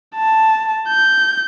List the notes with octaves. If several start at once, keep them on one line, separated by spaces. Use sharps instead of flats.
A5
G6